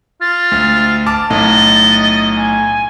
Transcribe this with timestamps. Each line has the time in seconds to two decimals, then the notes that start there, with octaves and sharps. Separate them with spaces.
0.21 F4 A6
0.51 D2
1.06 A5 D6 F6 A6
1.30 B1 A2 D#5
2.37 G#5